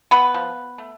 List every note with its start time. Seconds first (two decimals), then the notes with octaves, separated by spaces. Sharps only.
0.11 B3 B4
0.34 F3
0.78 A3